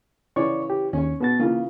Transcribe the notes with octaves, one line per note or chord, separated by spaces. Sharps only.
C#3 E3 C#5 D5 C#6
G4
D#2 C#4 C#5
B2 B3 F#4 A6
C#3 E3 A#3 F4